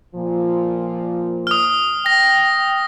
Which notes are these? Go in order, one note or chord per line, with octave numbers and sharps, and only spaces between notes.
A#2 F3
D#6 F6
G5 A#6